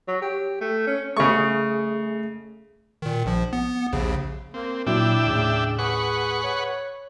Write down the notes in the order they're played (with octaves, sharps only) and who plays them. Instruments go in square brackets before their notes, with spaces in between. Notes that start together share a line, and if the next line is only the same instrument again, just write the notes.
[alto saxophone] F#3
G4
A3
C#4
[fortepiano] C#3 C#6 [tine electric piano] A3 G#4
[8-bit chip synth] A#2 D#3
A#1 F3
B3
A#1 D#2 C#3
[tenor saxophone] A#3 [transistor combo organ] C4
[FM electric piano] A#2 F#3 [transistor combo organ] D4 E5 G5 [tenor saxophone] E4
[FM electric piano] D#2 A2 [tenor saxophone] C#3
[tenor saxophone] G#4 [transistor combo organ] B4 F#5 C#6
[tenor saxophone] C#5